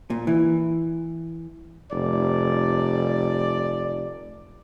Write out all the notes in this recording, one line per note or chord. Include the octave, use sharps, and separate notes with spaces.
A#2
E3
F1 D5